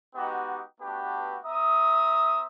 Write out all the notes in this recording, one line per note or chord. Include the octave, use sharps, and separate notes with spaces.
G#3 B3 D#4 F#4 G4
A3 B3 D4 F#4 G4 B4
C4 E5 A#5 D#6